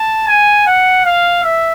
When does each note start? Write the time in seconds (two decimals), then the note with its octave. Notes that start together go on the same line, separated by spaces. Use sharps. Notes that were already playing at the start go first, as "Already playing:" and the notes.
Already playing: A5
0.28 G#5
0.67 F#5
1.05 F5
1.43 E5